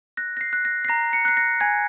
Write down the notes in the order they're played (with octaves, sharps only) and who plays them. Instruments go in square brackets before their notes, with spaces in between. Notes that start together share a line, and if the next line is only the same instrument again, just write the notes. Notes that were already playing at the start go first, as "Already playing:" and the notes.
[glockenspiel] F#6 A#6
A#6
C7
F#6
A#6
C7
A#5 A#6
C#7
F#6 C7
A#6
G#5 G#6